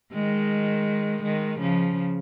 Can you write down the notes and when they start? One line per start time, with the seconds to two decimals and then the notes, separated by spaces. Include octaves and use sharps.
0.13 D#3 G#3
1.23 D#3 G#3
1.59 C#3 F3